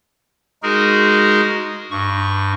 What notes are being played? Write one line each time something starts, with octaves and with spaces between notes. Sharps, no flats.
G#3 D#4 F#4 G#4 A#4
G2 C#6